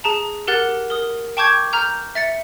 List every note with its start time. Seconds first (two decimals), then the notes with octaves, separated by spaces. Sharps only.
0.04 G#4 A5 A#5
0.48 G4 A#4 F#5 F#6 A6
0.90 A#4 D#6
1.37 G5 A5 C#6 D6 G6 G#6
1.73 A#5 F6 G6
2.15 E5 A6 C#7